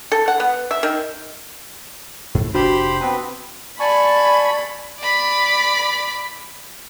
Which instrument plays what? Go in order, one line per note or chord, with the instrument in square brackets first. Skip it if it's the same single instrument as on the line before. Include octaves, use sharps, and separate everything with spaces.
[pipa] A4
F#5
B3
E5
D#3
[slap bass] G#2
[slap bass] F1 D4 [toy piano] F#4 [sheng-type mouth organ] G4 C5 B5
[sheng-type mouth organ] B3 C4 B4 [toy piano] F#5 A5
[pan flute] D5 [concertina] G#5 A5 C#6 [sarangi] B5
[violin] D5 B5